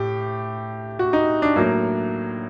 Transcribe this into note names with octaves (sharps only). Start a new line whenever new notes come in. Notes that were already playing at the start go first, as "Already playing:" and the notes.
Already playing: A2 G4
F#4
D#4
D4
A2 F#3 A#3